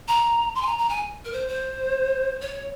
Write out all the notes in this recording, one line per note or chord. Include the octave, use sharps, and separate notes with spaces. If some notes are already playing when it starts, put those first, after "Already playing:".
A#5
C6
G#5
A#5
A#5
G#5
A#4
C5
C5
C#5